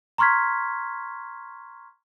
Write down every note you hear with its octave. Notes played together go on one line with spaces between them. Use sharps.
A#5 C6 C#6 F6 G#6 B6